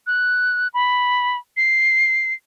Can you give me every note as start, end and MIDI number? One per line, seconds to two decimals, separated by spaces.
0.07 0.68 90
0.74 1.37 83
1.57 2.34 96